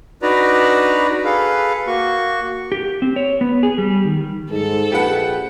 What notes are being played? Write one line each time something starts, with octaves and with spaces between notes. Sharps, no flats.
D4 D#4 F#4 B4 D5 A#5
G#4 A4 B4 F5
A#3 F#4 C#6
G4
C4
C#5
B3
G#4
G3
D#3
G#2 A4
A#1 G4 B4 F#5